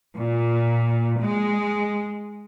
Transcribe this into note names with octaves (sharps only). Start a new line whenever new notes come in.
A#2
G#3